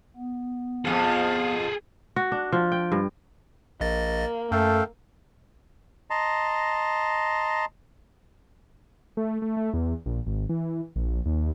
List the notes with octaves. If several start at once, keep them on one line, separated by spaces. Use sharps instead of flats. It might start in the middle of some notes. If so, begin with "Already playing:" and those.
B3
F2 B2 F3 G#4 A4
F#4
D4
F3
G5
G2
A#1 A#3 D#5 A6
F#2 A3 A4 F5 G5
D#5 A5 A#5 C6
A3
A3
A3
E2
A#1
G#1
E3
A#1
D#2